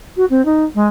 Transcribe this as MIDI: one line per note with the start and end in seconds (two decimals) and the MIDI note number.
0.16 0.24 66
0.29 0.44 60
0.44 0.63 63
0.74 0.87 56